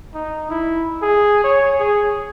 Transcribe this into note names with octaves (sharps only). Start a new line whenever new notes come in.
D#4
E4
G#4
C#5
G#4